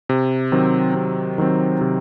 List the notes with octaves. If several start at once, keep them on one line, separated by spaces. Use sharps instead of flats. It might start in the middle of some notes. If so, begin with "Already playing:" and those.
C3
D#3 F#3 C4
C3
D#3 F#3 C4
C3